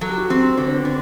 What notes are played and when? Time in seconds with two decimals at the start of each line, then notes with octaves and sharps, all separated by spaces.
0.01 F#3 A4
0.09 G4
0.18 F#4
0.25 G4
0.30 C4
0.58 D3 C4
0.68 C4
0.76 B3
0.85 D3